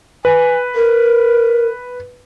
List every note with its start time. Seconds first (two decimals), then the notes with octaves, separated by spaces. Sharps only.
0.25 B4 G#5
0.75 A#4